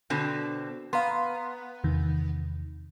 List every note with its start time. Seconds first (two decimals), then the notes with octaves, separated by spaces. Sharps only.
0.10 B2 D3 C4
0.93 B3 F5 A#5 C6
1.84 E2 C3 D#3